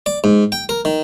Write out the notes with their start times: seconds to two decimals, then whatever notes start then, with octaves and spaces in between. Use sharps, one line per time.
0.06 D5
0.24 G#2
0.52 G5
0.69 A#4
0.85 D#3